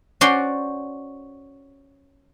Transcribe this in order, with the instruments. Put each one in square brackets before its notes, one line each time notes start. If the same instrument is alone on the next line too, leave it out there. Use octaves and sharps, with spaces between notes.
[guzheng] C#4 F#4 C5 D5 C6